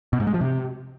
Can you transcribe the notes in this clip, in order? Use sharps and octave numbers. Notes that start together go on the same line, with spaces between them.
B2
G#2
G#3
F3
C3